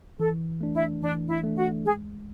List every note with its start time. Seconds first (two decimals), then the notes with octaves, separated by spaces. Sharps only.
0.19 E3 A4
0.61 A3 D4
0.74 E4
1.02 E3 D4
1.29 E4
1.44 A3 D4
1.57 F#4
1.85 G#3 G#4